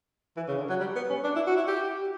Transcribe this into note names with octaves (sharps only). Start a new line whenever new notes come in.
E3
C#3
D3
F#3
G3
B3
C#4
D4
E4
F#4
E4
G4